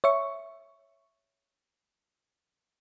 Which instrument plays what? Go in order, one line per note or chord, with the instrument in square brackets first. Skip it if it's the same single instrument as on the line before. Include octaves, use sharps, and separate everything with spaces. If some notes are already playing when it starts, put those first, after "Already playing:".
[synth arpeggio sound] C#5 E5 C#6